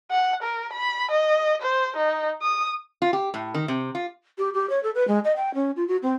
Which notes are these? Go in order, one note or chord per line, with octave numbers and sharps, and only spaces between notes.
F#5
A#4
B5
D#5
C5
D#4
D#6
F4
G4
A2
D#3
C3
F4
G4
G4
C#5
A4
B4
G#3
D#5
G5
C#4
F4
F#4
C4